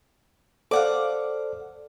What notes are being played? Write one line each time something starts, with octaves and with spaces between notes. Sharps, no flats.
A4 C5 D5 F5 F#5 D6